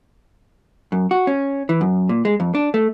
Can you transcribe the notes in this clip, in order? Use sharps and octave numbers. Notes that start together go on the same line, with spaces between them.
F#2
F#4
C#4
E3
F#2
A#2
G#3
F2
D4
A3